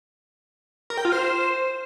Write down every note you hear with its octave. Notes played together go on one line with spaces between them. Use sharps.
A#4
G5
F4
C5